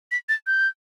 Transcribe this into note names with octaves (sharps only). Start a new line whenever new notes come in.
B6
A6
G6